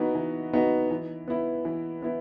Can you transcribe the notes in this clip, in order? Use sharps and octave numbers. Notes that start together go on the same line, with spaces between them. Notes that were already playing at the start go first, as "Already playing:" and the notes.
Already playing: E3 B3 D#4 F#4
E3
B3 D#4 F#4
E3
B3 E4
E3
B3 E4